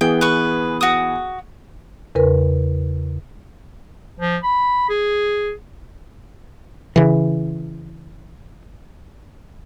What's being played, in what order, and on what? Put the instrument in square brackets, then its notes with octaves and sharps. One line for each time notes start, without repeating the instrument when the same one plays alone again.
[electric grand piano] E3 B3 G#4 [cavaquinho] G5
[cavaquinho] B4 C#6
F#4 D#6
[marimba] E2 C#3 A#4 B4
[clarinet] F3
B5
G#4
[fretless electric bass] C#3 E3